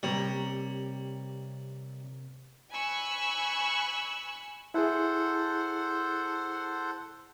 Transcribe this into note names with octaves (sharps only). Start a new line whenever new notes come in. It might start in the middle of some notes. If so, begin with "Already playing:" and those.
C3 G3 A#3 C#5
G#5 B5 C#6 E6 F#6
E4 G#4 A4 C5 F#5